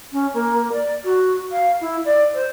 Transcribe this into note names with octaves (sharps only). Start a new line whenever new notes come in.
C#4
A#3
D5
F#4
F5
E4
D5
C5